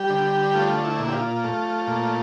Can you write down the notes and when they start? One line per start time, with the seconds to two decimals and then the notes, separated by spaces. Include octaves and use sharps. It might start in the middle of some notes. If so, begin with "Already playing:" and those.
Already playing: G3 G4
0.10 D3
0.55 A3 F4
0.84 E4
0.99 A#2
1.08 G4
1.13 F4
1.44 A3
1.87 A#2